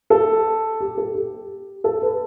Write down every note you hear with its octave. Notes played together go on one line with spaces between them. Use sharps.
A4
G4
A4
G4
A4
B4